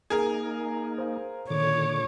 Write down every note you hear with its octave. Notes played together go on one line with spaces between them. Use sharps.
A#3 D#4 G#4 A#4 G#5
C5 F5
A#2 D3 D#3 C#5 D6